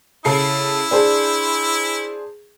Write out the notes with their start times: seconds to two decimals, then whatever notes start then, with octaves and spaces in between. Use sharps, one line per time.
0.25 C#3 E4 A4 C7
0.91 D4 G#4 C5